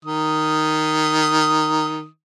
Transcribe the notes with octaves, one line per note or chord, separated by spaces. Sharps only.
D#3 D#6